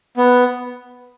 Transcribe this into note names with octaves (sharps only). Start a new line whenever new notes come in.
B3